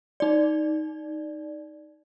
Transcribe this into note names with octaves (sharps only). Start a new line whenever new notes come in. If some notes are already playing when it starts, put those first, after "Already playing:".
D#4 D5